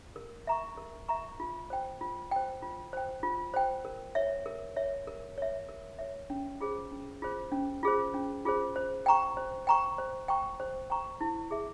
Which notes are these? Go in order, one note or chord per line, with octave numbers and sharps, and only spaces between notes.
A#4
E5 A#5 C#6
A#4
E5 A#5 C#6
F4
C5 G5
F4
C5 G5
F4
C5 G5
F4
C5 G5
A#4
C#5 E5
A#4
C#5 E5
A#4
C#5 E5
A#4
C#5 E5
C#4
F4 G#4 C5
C#4
F4 G#4 C5
C#4
F4 G#4 C5
C#4
F4 G#4 C5
C5
G5 A#5 C#6
C5
G5 A#5 C#6
C5
G5 A#5 C#6
C5
G5 A#5 C#6
E4
G#4 E5